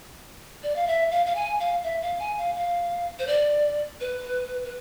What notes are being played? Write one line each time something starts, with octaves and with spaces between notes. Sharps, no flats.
D5
F5
E5
F5
F5
G#5
F5
E5
F5
G#5
F5
F5
C5
D5
B4
B4